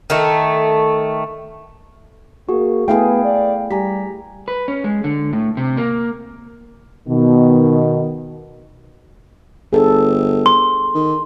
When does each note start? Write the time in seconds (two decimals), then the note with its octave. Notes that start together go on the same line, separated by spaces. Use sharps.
0.10 D#3 A3
2.49 A#3 F#4 G#4
2.88 A3 B3 E4 G#4 F5 G5
3.24 D5
3.71 G3 G4 G#5 A#5 B6
4.48 B4
4.68 C#4
4.84 G#3
5.04 D3
5.33 A2
5.57 C3
5.77 A#3
7.08 B2 D#3
9.73 G1 G#4 A4
10.46 C6
10.95 D#3